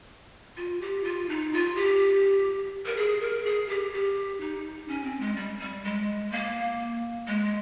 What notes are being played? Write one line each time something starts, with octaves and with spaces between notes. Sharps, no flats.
F4
G4
F4
D#4
F4
G4
A#4
G#4
A#4
G#4
G4
G4
D#4
C#4
C4
G#3
G3
G3
G#3
A#3
G#3